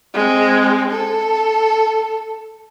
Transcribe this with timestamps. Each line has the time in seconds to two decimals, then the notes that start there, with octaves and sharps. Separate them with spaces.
0.14 G#3 C4
0.91 A4